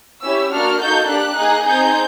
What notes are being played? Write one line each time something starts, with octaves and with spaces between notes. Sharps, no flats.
C#4 E4 G4 E6
A#3 D4 F#4 A4 F6
A#3 D#4 F#4 A4 G6
D4 G4 F#6
A#3 D#4 G#4
C4 D#4 G#4 G6